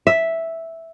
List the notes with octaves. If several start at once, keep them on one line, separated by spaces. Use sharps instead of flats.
E5